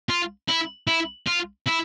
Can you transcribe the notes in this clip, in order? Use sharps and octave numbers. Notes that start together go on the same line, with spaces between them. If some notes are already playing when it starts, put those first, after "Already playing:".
F4
E4
E4
F4
E4